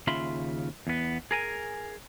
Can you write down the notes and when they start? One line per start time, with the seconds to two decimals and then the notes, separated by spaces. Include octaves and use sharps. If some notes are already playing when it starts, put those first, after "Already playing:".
0.07 D#2 C#3 F4 E5 B5 C6
0.87 E2 B3
1.31 G#4 A#4 G#5